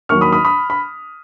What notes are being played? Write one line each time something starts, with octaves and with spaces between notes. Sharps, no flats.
D#2 D#3 F#3 C#6 F6
B5 D#6
B5 D#6
B5 D#6
B5